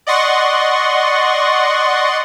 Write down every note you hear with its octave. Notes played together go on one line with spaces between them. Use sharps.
D5 D#5 F#5 C6 C#6